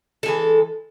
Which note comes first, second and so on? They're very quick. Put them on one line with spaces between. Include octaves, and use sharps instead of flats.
A4 G#3 E3